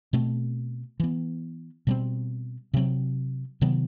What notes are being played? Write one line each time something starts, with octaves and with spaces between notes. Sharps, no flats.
B2 A3 C4
E3 B3
B2 G3 C4
C3 F#3 C4
C3 D#3 F#3 B3